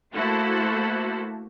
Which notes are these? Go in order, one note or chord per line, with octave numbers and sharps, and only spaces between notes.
A3 A#3 E4 F#4 A4 C5